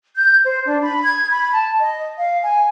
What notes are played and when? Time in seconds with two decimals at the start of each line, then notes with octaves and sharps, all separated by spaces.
0.14 G6
0.43 C5
0.65 D4
0.82 B5
1.04 G#6
1.29 B5
1.52 A5
1.80 D#5
2.17 F5
2.43 G#5